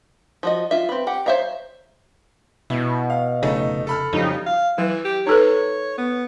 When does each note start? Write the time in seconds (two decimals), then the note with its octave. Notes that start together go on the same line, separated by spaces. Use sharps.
0.43 F3 F#4 D#5
0.71 F4 E5
0.89 C4 B4
1.07 G4 F#5
1.26 C5 C#5 E5 F5 A#5
2.70 B2 E4
3.10 F5
3.43 F1 C#3 A3 D#4
3.87 A4 B5 F6
4.13 F2 C#3 F#3 G3 D#4
4.46 F5
4.78 E3 F#3
5.05 G4
5.27 D#4 A4 B4 C#5
5.98 B3